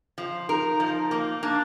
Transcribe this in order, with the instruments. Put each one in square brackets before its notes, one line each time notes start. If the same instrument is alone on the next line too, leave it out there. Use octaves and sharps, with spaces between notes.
[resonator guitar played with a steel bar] F3
[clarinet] D#4 [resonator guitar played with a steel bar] A#4
[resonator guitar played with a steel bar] F3
A#3
[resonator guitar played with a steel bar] A#3 [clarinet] D4